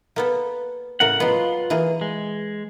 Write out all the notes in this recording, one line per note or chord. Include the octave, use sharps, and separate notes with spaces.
A#3 B3 A4
A2 C#3 A#4 F#5
F#3 G#3 B3 F4
E3 A#3 G#4
G#3